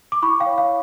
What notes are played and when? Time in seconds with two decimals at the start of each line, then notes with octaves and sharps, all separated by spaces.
0.12 D6
0.22 E4 B5 C#6
0.40 F5 G5
0.46 C#5
0.58 F5